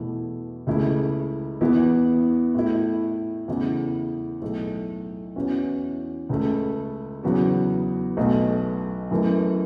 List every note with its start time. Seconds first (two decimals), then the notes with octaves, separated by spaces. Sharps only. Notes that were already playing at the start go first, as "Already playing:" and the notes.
Already playing: E2 B2 A3 E4
0.67 C#2 C#3 A3 E4
1.61 E2 E3 B3 E4
2.55 A2 A3 E4
3.48 E2 C#3 A3 E4
4.42 B1 A2 A3
5.36 E2 E3 C#4 F#4
6.29 C#2 C#3 A3
7.23 E2 C#3 F#3 B3 F#4
8.17 B1 B2 A3 F#4
9.11 F#2 E3 A3 E4